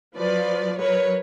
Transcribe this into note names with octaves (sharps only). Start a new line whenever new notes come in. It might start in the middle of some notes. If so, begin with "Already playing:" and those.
F3 F#3 B4 D5
F#3 A#4 B4 C#5